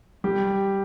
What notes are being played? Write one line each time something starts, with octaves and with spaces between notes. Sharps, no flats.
G3 G4